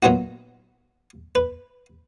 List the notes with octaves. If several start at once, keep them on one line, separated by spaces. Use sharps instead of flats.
A#2 F#3 B3 D#4 F#4
B4